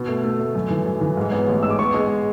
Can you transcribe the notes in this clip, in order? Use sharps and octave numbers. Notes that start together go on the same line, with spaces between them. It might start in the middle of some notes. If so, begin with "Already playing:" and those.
Already playing: B2
A3
A3
A3
F#2
E3
F#2
E3
G#2
B3
A1
G#3 E6
D6
B3 C#6
G#3